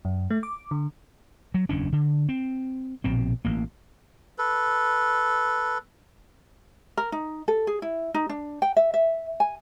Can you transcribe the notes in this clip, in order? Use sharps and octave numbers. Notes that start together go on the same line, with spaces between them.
F#2
A3
D6
D3
F#3
F#1 E2 C#4 D4
D3
C4
A#1 B2 C4
A1 A#3
A4 B4
A#4
D#4
A4
G#4
E4
D#4
D4
G5
E5
E5
G#5